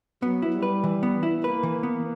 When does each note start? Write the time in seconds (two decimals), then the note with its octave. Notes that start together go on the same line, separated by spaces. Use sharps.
0.22 F#3 B3
0.42 E4
0.54 G3
0.63 B4
0.84 E3
1.03 B3
1.23 E4
1.43 A#3 B4
1.63 E3
1.83 B3